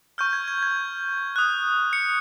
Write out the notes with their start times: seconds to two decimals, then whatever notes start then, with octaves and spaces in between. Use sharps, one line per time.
0.18 C#6 F6 G6
0.33 G#6
0.48 G#6
0.63 G#6
1.36 D#6 F#6
1.93 C#7